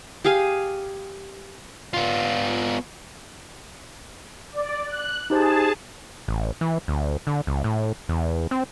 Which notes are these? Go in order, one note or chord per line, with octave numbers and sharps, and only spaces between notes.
G4 G#4 F5 G#5
B3 F4
D5
F#6
D#4 G4 G#4 C5 A5
A1
E3
D2
D3
C#2
A2
E2
C4